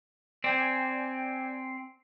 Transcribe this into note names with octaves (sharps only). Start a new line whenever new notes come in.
C4 D5 G5 G#5